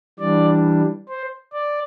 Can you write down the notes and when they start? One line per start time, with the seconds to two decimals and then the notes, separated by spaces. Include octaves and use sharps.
0.19 E3 G3 D4 D5
1.09 C5
1.53 D5